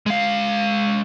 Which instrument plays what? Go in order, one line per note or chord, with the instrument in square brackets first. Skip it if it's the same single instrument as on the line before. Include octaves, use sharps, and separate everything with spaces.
[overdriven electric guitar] G#3 F5